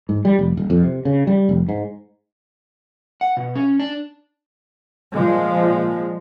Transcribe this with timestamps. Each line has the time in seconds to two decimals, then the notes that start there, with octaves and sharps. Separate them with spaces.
0.09 G#2
0.25 G3
0.39 F1
0.57 D#1
0.70 F2
0.83 C3
1.05 C#3
1.27 G3
1.49 F1
1.69 G#2
3.21 F#5
3.37 B2
3.55 C#4
3.80 D4
5.14 A#2 F3 G#3